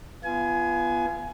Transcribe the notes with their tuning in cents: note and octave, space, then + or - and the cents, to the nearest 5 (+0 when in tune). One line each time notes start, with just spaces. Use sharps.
B3 +0 F4 -30 G#5 +20